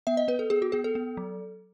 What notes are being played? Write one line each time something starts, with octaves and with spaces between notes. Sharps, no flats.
B3 E5
D#5
B3 B4
A4
B3 G#4
F#4
B3 G#4
A4
B3
F#3